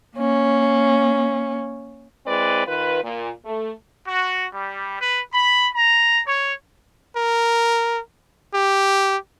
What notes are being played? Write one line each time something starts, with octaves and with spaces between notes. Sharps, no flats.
A#3 C#4
G#3 C4 E4 B4 D5
D#3 F4 B4
A#2
A3
F#4
G3
B4
B5
A#5
C#5
A#4
G4